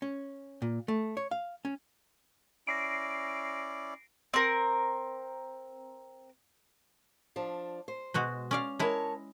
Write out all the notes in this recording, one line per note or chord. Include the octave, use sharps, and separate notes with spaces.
C#4
A#2
A3
C#5
F5
C#4
C#4 E4 D5 A#6 C7 D7
C4 A#4
F3 D4
C5
B2 G#3 F#4
C#4 D5 F5
G#3 E4 A#4 C#5 A5